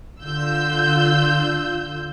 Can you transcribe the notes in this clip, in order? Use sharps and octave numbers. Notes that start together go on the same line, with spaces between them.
D3 F4 E6 G6